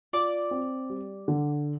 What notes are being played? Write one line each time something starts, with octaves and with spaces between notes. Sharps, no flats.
F4 D5 D6
C4
G3
D3